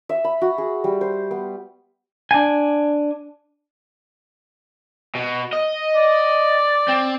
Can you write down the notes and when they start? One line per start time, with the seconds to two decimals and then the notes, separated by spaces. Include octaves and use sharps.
0.09 E5
0.24 B5
0.42 F#4
0.58 G#4
0.84 G3
1.01 C5
1.31 B3
2.31 D4 G#5
5.15 B2
5.53 D#5
5.96 D5
6.89 C4